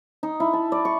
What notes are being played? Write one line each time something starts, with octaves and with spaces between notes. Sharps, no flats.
D#4
E4
A5
D5
C#6